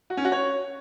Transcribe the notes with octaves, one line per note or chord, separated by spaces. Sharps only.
F#4
C#4
F#4
C#5